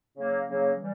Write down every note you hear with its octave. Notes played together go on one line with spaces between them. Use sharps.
C#3 F#3 A#3
C#3 F#3 A#3
E3 G3